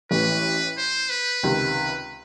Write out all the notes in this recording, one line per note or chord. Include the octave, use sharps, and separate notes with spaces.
A1 A2 E3 B4
C5
B4
C#2 C3 D#3